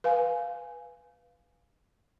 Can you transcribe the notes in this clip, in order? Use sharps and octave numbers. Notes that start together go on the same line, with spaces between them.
B4 F5 G#5